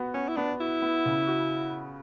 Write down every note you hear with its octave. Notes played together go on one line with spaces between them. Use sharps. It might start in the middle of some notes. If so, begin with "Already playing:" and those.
Already playing: B3 F#4
B3 C#4
E4
B3 D4
E4 F#4
B3
C#3
F#4